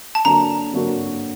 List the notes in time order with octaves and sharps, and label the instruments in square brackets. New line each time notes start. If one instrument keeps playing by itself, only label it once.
[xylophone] A5
[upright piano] D3 F#3 A#3 F#4 [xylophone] A#5
[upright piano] D3 F#3 A#3 F#4